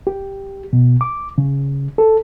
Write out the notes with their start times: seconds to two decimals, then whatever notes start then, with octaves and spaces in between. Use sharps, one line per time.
0.07 G4
0.73 B2
1.01 D6
1.38 C#3
1.98 A4